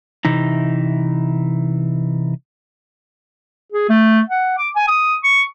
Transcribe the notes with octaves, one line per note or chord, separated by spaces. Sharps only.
C3 E3 D#4
G#4
A3
F#5
D6
G#5
D#6
C#6